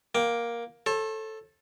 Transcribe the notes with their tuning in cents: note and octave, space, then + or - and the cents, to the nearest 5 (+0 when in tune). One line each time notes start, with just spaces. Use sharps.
A#3 +10 G5 +0
A4 +0 C#5 -45